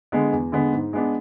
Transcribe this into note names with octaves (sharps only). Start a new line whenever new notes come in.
D3 G#3 B3
E2
D3 G#3 B3
G#2
G#3 B3 D4